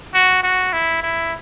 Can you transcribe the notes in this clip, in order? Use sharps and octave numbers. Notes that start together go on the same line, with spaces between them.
F#4
F#4
E4
E4